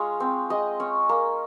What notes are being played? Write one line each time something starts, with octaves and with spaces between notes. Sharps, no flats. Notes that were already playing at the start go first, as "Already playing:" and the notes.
Already playing: G#3 C#4 F4 C#5
C4
G#3 D#5
C#4
A#3